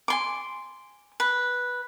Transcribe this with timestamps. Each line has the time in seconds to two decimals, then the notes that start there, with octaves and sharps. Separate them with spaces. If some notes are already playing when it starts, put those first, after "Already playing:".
0.08 G#5 C6 D6
1.20 B4